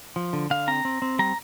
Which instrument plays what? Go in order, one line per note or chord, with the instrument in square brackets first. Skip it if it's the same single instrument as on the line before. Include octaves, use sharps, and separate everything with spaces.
[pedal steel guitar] F3
D3
D3 F5
C4 A#5
C4
C4
G3 A#5